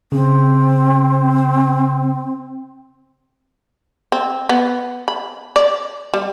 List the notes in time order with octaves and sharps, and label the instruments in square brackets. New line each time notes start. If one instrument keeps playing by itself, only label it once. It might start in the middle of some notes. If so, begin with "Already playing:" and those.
[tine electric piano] C#3 [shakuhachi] C4
[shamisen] C4
B3
B5
D5
G3